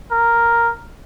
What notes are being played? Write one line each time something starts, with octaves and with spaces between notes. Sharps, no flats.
A#4